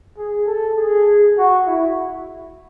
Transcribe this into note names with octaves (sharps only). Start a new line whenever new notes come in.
G#4
A4
G#4
F#4
E4